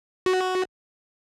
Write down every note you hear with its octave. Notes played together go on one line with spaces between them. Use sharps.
F#4